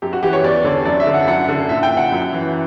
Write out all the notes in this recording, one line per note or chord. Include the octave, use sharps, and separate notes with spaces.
F#2 G4
F#4
E3 G4
C#5
E2 D5
D3 C#5
F#2 D5
E5
D3
F#5
F#2 F#5
D3
A#2 E5
G5
F#5
F#2
E3